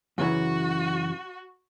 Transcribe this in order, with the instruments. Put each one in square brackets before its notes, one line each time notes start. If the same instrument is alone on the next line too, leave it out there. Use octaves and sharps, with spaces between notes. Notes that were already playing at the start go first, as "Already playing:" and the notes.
[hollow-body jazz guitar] F#2 C#3 E3 [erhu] F#4